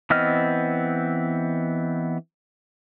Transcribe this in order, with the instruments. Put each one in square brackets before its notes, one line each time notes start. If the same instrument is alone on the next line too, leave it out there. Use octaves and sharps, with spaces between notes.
[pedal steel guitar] E3 B3 C4 D#5 F6